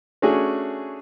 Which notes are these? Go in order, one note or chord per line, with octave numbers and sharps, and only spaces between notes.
A3 C#4 D4 F#4 G#4